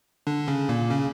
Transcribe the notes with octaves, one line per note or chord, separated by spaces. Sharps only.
D3 D4
C#3 C#4
A#2 A#3
C#3 C#4